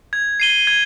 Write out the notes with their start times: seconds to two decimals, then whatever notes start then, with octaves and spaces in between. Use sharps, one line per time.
0.13 G#6
0.40 C7 D#7 G7
0.67 G#6